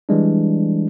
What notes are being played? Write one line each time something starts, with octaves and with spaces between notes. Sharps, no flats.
E3 G3 G#3 D4